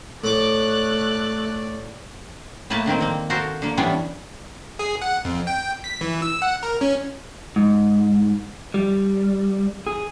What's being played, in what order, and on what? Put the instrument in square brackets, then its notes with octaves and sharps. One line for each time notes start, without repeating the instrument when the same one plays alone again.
[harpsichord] A2 D6 [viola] A3 [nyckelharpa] D5 [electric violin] F#6
[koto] A2 A3 A#3 B4 A5
D3 D#3 A#3 C4
A#3 C4
F#4 A4 A#4 C5 F5
D3 A#3
E3 G3 B3 C#4 D4
[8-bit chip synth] G#4
F#5
F2
G5
B6
E3
E6
F#5
A#4
C#4
[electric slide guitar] G#2
G3
G#4